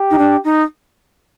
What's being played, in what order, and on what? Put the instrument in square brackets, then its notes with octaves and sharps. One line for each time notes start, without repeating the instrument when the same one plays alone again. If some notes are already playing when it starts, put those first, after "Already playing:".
Already playing: [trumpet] G4
[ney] D#4
D4
D#4